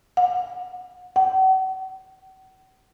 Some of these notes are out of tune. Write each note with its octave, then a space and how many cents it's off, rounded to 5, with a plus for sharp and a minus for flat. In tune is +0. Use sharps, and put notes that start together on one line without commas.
F#5 -30
F#5 +40